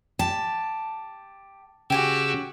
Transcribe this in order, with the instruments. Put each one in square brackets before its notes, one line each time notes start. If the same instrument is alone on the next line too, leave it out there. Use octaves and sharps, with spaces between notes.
[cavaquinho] G4 [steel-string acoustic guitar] A5
[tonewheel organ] C#3 E6 [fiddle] F#4 G4 [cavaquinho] G5 G#5 D6